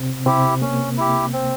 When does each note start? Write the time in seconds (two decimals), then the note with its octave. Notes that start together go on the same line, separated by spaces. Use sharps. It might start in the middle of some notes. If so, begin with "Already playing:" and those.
Already playing: C3 C4
0.26 C3 C4 E4 G4
0.61 A#3 C#4
0.98 E4 G4
1.33 C4